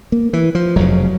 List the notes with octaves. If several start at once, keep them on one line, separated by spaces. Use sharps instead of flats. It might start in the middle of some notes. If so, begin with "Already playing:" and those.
A#3
E3
F3
F1 F2 C#3 F#3